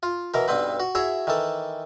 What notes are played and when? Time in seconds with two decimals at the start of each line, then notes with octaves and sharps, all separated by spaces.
0.03 F4
0.34 B2 E3 A#4
0.48 B1 G2 B3 C4 B4
0.80 F#4
0.95 E4 F#4 G#4 C#5 E5
1.27 D#3 E3 A4